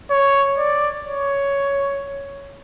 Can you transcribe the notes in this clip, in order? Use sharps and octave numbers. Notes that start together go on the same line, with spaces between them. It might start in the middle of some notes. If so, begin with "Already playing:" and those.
C#5
D5
C#5